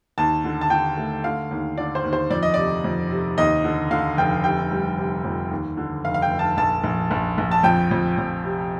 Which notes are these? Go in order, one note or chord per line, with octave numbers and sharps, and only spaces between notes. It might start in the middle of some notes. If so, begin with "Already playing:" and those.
D#2 A5
D3
A5
D3 G5
A3
D3 F5
D#2
D3 D5
C5
D#2
C5
F2 D5
D#5
C3 D5
F2
C3
D#2 D#5
D3
D3 F5
F1 G5
C3 G5
G3
C3
F2
D#2
D3
F1 F5
F5
G5
F1
A5
A#1 A5
A#1
A#1
A#1
A5
F2 G5
F2
F2
C3